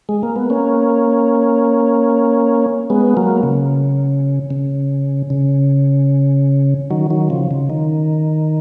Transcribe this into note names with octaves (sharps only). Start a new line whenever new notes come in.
G#3
A#3
B3
A#3 C#4
G#3 B3
F#3 A#3
C#3
C#3
C#3
D#3 F#3
D#3 F#3
C#3 F3
C#3
D#3